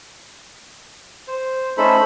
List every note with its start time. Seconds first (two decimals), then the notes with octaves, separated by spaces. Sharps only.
1.28 C5
1.78 A3 C#4 D#4 A4 C5 B5